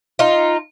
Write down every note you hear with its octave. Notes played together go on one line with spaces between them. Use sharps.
D#4 F4